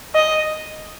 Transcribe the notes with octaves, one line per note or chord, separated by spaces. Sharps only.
D#5